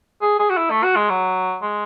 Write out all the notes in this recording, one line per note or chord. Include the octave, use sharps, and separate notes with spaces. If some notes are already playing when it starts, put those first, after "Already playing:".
G#4
G#4
F#4
E4
A3
F#4
G#3
F#3
G#3